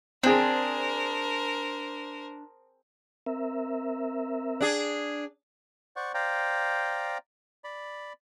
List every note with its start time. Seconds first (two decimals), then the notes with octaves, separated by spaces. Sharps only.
0.23 C4 D4 G#4 A#4 C5
3.26 C4 A#4 E5
4.61 D4 G#4
5.96 C5 D5 F#5 C#6
6.14 C5 D5 F5 G5 A#5
7.64 D5 B5